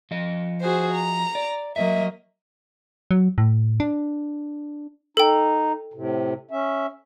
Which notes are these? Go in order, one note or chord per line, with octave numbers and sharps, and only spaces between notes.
F3 D#5
F#4 G#4 C5
A#5
D5
F#3 A#3 D#5 E5
F#3
A2
D4
D#4 A4 G5
A2 C3
C#4 E5